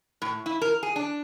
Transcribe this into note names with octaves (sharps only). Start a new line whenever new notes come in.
A2
E4
A#4
G#4
D4